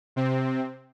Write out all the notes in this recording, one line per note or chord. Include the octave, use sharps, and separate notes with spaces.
C3 C4